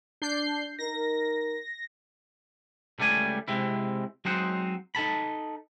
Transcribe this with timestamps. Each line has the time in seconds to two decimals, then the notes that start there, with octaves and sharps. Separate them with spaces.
0.22 D4 G6 C7
0.79 D#4 A#4 A#6
2.99 C#2 G3 A3 D5 G#5
3.48 C3 G#3 C4 E4
4.25 F#3 G#3 C4 D#4 C5 F#5
4.95 D#4 A4 A5 B5